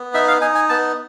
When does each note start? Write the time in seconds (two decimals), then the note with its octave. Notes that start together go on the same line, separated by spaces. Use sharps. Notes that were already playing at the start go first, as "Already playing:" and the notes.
Already playing: B3
0.14 D#4 E5
0.28 F5
0.41 D#4 G#5
0.55 G#5
0.69 B3 A5